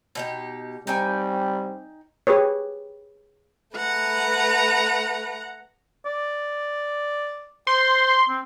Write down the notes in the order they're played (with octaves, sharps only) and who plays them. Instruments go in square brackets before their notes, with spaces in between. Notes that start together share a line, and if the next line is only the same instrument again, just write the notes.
[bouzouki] B2 D#4 G4
[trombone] G3 [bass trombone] C4 [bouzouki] D#4 G5 G#5
[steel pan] G4 G#4 B4 C#5
[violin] A3 B4 [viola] F#5 A#5
[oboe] D5
[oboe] C5 [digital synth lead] C6
[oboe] C4